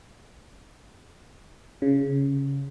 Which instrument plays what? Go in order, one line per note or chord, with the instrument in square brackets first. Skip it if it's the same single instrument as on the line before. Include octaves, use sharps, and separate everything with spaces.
[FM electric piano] C#3